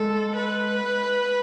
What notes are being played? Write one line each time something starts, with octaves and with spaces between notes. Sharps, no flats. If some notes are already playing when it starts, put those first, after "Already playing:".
Already playing: G#3 A4
B4